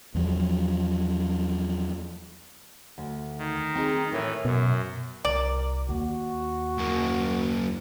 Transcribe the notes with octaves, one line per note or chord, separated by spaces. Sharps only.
E2 F3 F#3
D2
D#3
C4 D#4 G#4
A2 E3 A#4 C#5 E5
F#2 B2
C2 A#4 D5
D#2 F#4
F#2 A#3